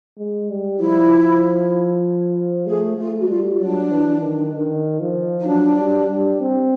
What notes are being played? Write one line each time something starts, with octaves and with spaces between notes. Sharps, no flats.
G#3
G3
F3 E4
A3 G#4
A3 F4
F#4
G3 F4
F#3 D4
E3
D#3
D#3
F3
D#4
F#3 D4
G3
G3
C4